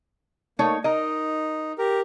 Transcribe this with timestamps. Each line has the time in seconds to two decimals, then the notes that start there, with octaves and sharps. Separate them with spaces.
0.59 A3 A#3 D#4 C#5
0.84 D#4 A#4 D#5
1.78 G4 A#4